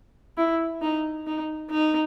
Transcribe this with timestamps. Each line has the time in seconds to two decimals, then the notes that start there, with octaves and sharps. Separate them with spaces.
0.37 E4
0.82 D#4
1.27 D#4
1.70 D#4